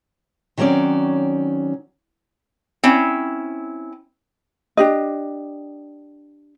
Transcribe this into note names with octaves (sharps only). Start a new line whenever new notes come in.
D#3 F#3 C4 C#4 D5
C4 C#4 E4
D4 G4 D#5